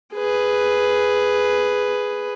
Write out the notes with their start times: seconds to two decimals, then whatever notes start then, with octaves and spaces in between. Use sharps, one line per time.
0.14 G#4 B4